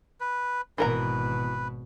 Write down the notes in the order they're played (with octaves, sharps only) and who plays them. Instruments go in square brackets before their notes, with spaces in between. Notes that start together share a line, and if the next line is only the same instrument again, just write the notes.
[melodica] B4
[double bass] G#1 B2 [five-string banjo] E3 A#4 A#5 [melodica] B4